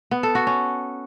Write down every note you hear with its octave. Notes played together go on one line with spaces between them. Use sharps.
B3
A4
F#4
C#4